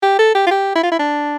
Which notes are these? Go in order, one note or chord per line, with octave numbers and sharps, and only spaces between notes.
G4
A4
G4
F4
G4
E4
F4
E4
D4